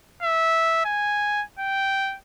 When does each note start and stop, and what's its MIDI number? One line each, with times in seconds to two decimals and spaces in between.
0.23 0.82 76
0.85 1.44 80
1.59 2.17 79